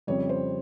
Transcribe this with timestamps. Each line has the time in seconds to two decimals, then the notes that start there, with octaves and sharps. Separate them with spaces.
0.07 F2 C#3 G3 C#5
0.29 C5